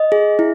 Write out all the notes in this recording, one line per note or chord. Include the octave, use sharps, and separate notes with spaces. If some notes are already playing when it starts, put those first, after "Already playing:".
Already playing: D#5
G#4
E4